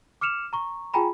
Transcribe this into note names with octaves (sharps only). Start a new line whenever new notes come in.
D6 F6 C#7 E7 F7
A#5 C#6
F4 G#4 G5 G#5 A#5 B5